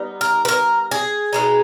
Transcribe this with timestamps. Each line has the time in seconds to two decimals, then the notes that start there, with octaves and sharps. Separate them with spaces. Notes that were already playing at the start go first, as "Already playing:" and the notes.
Already playing: G3 B3 D#4
0.21 A#4
0.45 B4
0.48 A#4
0.91 G#4
1.33 B2 G#3 D#4